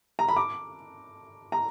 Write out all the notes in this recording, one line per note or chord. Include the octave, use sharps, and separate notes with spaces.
A#5
B5
D6
A#5